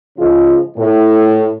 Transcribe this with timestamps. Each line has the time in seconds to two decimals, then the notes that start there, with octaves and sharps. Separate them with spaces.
0.18 G#2 C#3 F3 F4 G#4 D#5
0.77 A2